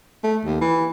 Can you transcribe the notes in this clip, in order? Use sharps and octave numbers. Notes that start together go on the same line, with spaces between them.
A3
D#2
E3